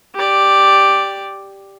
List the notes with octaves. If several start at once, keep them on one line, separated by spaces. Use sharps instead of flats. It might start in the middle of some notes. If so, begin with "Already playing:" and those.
G4 D5